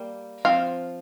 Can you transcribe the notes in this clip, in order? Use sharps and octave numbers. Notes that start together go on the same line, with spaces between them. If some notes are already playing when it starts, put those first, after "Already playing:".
Already playing: G3 A#3
F3 C4 F5